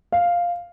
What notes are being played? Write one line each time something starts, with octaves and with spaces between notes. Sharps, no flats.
F5